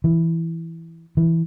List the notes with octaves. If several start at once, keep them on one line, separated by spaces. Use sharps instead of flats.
E3
E3